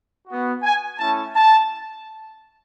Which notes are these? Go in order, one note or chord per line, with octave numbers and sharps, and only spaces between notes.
B3 F#4
G#5
A3 C#4 E4 A5
A5